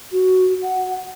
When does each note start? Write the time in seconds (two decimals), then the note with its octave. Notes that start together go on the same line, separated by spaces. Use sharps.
0.12 F#4
0.63 F#5